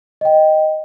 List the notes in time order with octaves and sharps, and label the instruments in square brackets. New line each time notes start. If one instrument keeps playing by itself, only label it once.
[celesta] D#5 G5